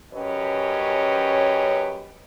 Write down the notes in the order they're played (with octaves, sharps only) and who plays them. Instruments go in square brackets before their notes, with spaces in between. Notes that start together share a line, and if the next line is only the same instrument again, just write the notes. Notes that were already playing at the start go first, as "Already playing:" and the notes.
[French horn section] F#2 C#4 G4 B4 C#5 D#5